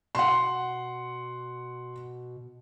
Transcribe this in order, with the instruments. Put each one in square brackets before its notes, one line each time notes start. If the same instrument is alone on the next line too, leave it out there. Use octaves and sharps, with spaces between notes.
[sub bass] B2 [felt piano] F#5 C6